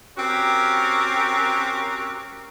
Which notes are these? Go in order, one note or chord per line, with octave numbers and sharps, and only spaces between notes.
C4 C#4 F#4 G4 A#4